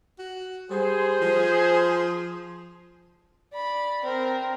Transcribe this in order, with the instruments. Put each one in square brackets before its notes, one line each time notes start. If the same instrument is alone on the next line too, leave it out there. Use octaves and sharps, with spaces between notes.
[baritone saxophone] F#4
[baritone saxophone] G3 [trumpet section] G#4 C5
[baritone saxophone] F3
[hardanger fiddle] D5 B5
C4 A#4